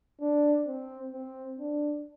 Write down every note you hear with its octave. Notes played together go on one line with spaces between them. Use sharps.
D4
C4
C4
D4